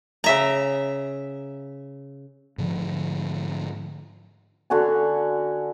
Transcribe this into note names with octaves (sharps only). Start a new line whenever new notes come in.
C#3 E5 A#5
G#2 D3 F3
D3 F#4 G#5